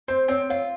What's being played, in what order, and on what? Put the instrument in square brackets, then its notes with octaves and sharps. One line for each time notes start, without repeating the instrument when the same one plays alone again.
[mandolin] C4 [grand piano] C5
[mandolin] C4 [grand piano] C#5
[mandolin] F4 [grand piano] C#5